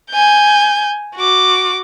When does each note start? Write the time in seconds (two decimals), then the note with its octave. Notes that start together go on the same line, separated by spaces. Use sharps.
0.11 G#5 G6
1.16 F#4 D6